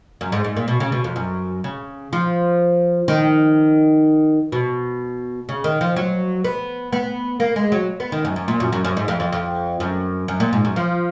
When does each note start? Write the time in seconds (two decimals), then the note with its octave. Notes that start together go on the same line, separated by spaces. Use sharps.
0.21 F#2
0.32 G#2
0.44 G#2
0.57 A#2
0.68 B2
0.80 C#3
0.92 B2
1.04 F2
1.16 F#2
1.64 C#3
2.13 F3
3.08 D#3
4.52 B2
5.49 C#3
5.64 D#3
5.81 F3
5.96 F#3
6.44 B3
6.93 B3
7.40 A#3
7.56 G#3
7.72 F#3
8.00 B3
8.12 D#3
8.25 F#2
8.36 F#2
8.48 A#2
8.60 F#2
8.72 F#2
8.85 F#2
8.97 G#2
9.08 F2
9.20 F2
9.32 F2
9.80 F#2
10.28 F#2
10.40 A#2
10.53 G#2
10.65 F#2
10.76 F3